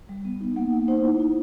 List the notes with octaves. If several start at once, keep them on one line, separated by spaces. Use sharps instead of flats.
G3
B3
D#4
A#3 F#5
D#4
D#4 C5
E4
E4